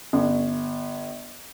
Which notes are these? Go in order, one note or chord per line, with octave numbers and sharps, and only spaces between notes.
G1